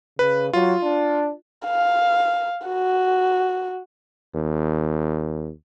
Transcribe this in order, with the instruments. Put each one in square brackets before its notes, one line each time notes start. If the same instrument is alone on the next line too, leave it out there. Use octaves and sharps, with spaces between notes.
[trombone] C#3 [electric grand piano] B4
[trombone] F#3 [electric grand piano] F4
[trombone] D4
[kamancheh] F5
F#4
[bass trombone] D#2